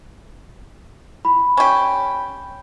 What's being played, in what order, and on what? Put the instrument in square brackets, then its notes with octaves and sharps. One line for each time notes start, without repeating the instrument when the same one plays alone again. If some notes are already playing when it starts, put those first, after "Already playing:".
[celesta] B5
[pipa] C#4 G4